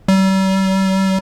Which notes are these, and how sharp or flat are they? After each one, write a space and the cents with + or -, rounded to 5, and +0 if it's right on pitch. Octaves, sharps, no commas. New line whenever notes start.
G3 -40